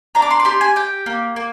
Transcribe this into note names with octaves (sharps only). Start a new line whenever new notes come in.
D4 A#5
D6
C6
D6
G4 C6
G#5
G4 G5
A#3
A#3